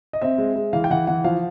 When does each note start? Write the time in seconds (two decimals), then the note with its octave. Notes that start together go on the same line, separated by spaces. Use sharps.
0.13 D#5
0.22 C4 E5
0.38 G#3
0.56 G#3
0.73 E3 F5
0.84 G5
0.90 E3 F#5
1.07 E3 F#5
1.24 F3 F5